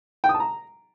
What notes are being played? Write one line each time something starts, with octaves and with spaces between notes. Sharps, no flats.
G5
D#6
A5
A#5